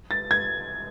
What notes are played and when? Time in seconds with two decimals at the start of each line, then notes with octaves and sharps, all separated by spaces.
0.11 A6
0.31 G#6